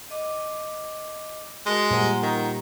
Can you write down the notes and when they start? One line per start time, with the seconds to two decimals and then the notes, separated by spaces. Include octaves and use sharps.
0.11 D#5 D6
1.66 G#3 F#4 A#4 A5
1.91 A#2 G3 F4 C5 F#5 A#5
2.23 D#3